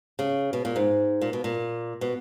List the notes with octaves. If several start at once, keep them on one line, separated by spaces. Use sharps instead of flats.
C#3
B2
A#2
G#2
A#2
B2
A#2
B2